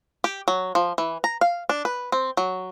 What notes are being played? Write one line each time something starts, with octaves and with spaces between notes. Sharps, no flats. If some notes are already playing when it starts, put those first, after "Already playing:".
G4
F#3
F3
E3
A#5
F5
D4
B4
C4
F#3